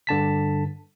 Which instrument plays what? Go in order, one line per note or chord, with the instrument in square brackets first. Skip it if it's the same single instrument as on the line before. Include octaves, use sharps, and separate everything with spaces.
[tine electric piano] G2 D3 A5 B6